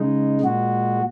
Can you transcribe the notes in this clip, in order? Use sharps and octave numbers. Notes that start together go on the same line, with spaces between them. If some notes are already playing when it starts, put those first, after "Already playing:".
Already playing: C#3 G#3 D#4
A#2 G#3 F#4